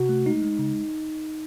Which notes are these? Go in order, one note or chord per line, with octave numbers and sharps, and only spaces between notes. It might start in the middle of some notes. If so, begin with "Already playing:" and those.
Already playing: C3 F#4
A3
G#3 D#4
G#3
C#3